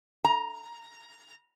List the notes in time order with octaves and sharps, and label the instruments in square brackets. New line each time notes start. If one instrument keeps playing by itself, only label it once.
[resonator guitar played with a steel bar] A#5